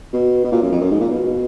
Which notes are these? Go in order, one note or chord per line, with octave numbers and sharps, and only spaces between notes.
B2
B2
A#2
F#2
F2
F#2
G#2
A#2
B2
B2